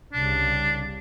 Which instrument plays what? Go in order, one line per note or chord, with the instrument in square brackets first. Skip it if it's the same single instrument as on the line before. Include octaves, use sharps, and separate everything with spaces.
[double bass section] C2 C#3 G3 [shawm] D4